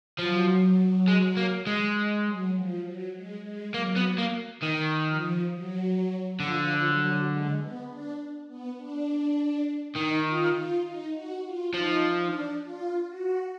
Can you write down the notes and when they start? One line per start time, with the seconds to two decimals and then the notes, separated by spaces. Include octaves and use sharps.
0.18 F3 F#3
1.08 G#3
1.37 A#3
1.67 G#3
2.26 F#3
2.55 F3
2.85 F#3
3.14 G#3
3.44 G#3
3.74 F#3 A#3
3.97 B3
4.18 A#3
4.63 D#3
5.07 F3
5.52 F#3
6.40 D3 F3
6.85 F#3
7.30 G#3
7.59 B3
7.89 D4
8.48 B3
8.77 D4
9.95 D#3 D#4
10.26 F4
10.54 F4
10.84 D#4
11.14 F#4
11.44 F4
11.73 F3 D#4
12.17 D4
12.62 F4
13.07 F#4